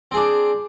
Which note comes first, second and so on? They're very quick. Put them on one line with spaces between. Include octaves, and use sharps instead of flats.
C4 G#4 D4